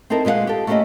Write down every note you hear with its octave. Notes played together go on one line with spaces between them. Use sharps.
C4 D#4 E4 A4 A#4
A#2 G#3 B4 F5 F#5
G4 A4
A3 A#3 C#4 E4 G4 D#5